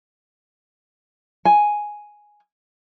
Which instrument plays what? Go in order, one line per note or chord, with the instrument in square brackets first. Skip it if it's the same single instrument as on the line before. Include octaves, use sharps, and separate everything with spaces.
[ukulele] G#5